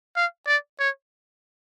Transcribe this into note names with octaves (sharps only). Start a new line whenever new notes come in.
F5
D5
C#5